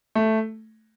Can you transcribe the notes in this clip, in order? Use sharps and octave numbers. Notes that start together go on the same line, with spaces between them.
A3